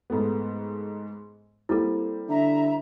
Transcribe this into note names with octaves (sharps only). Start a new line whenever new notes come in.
G#2 A3 B3
G3 A#3 C4 E4 A4
D3 E5 A#5